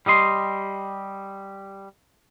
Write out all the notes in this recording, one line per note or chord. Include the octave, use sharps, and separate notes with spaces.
G3 G4 D#5 C6